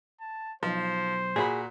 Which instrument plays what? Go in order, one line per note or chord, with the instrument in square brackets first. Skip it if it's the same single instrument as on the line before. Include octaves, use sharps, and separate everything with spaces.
[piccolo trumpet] A5
[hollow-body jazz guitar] B1 [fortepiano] F3 [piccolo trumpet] C5
[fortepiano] A#2 F#4 B5 [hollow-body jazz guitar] G#4